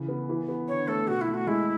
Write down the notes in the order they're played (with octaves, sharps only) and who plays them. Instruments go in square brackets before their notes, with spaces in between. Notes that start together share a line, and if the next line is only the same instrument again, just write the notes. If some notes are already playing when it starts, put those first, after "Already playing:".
Already playing: [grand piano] C#3 E3
B3
E3
B3
[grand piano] D3 [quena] C#5
[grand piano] A3 [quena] A4
[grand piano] B2 [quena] F#4
[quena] E4
[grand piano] A3
[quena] F#4
[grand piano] G#3 [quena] E4